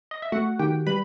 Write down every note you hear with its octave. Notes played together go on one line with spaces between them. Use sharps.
D#5
E5
A3 F#4 F#5
D#3 G4 G5
G3 B4 B5